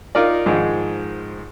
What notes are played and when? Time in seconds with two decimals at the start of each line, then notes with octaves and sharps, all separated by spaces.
0.15 D#4 F4 A#4 D5
0.46 G#2 D#3 F3 G#3